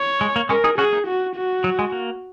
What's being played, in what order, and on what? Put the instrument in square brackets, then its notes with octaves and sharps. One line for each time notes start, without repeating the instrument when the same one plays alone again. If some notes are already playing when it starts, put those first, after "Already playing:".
Already playing: [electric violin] C#5
[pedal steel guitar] G#3
A#3
[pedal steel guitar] G#3 C#4 [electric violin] A#4
[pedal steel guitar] D#4 G#4
[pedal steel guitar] C#4 F#4 [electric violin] G#4
[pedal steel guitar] A#3 D#4
[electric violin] F#4
F#4
[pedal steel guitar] F#3
G#3
A#3